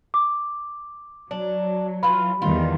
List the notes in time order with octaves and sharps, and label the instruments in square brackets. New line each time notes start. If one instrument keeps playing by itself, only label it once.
[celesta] D6
[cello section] F#3 [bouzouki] D4
[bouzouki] E3 F4 [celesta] B5
[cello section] E2 D#3 G3 [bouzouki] F4